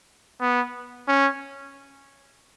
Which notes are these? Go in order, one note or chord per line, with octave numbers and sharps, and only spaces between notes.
B3
C#4